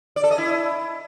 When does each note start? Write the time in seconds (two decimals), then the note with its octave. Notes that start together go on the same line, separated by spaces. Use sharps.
0.16 D5
0.24 A4
0.31 D#5
0.38 E4